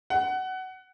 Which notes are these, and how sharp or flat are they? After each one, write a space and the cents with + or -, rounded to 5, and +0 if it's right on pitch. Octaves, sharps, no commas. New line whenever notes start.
F#5 +20